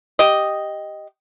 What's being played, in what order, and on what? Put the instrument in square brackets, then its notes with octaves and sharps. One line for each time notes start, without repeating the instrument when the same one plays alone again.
[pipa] G4 D#5